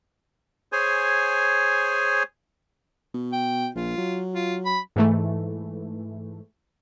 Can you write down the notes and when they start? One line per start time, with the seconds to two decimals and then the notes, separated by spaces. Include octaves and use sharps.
0.72 G#4 C5 C#5 G#5
3.14 B2
3.33 G5
3.75 A#1 F4
3.98 F#3
4.34 F4
4.65 B5
4.96 G#2 E3 A3